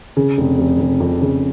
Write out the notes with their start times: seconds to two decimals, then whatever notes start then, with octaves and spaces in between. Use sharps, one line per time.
0.17 C#3
0.38 F1
0.58 F1
0.79 F1
1.00 F2
1.21 C#3